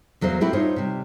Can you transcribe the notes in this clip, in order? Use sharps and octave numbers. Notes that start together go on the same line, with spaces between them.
E2 F#3 A#4 C5 F5
A3 C4 E4 F#4 G4 A#4
G2 D#4 F4 C5 C#5
C3 G3